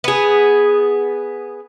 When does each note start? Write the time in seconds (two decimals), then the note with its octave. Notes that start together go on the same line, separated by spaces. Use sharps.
0.04 B3 G#4